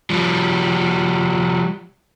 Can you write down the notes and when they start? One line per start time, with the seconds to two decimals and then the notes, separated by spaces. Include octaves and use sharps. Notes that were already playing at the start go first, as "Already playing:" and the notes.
0.10 F3 G3